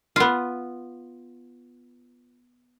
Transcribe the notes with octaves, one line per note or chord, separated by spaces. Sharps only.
B3 F4